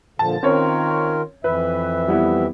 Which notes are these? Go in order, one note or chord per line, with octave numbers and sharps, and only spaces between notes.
A#2 D3 F3 A5
D#3 C4 C#4 F4 A#4 C#5
F2 E3 B4 E5
G3 B3 E4